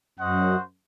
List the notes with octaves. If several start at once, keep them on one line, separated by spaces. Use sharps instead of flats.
F#2 F#4 C5 D#5 F#5